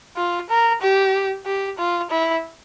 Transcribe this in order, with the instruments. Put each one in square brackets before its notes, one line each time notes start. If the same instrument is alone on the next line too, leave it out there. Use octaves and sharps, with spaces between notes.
[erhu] F4
A#4
G4
G4
F4
E4